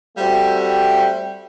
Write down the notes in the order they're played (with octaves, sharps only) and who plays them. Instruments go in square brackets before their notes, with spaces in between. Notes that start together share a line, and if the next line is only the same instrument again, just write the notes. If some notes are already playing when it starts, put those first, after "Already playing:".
[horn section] G3 A3 C4 F#4 E5 G5